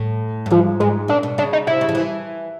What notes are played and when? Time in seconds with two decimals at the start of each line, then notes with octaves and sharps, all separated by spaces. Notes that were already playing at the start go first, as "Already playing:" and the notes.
Already playing: A2
0.46 G2
0.51 G#2 F3
0.80 G#2 G#3
1.08 A#2 D4
1.23 B2
1.38 C#3 D4
1.53 D#4
1.67 C3 E4
1.81 C#3
1.89 F3
1.95 E3